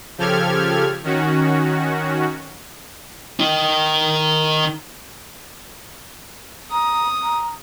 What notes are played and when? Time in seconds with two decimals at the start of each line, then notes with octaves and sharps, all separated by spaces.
0.18 C#3 F3 G4 A4 F6 G#6
1.03 D#3 C#4 F#4
3.40 D#3 D#4
6.71 A#5 D#6
7.23 A#5